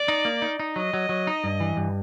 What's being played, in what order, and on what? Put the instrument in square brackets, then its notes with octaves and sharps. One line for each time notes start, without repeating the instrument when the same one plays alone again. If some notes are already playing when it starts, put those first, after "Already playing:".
Already playing: [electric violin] D5
[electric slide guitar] D#4
A#3
D#4
D#4
[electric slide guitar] F#3 [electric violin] D#5
[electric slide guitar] F#3
F#3
D#4
G2
E3
G2